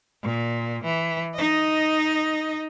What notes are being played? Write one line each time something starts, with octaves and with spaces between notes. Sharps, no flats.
A#2
E3
D#4 D#5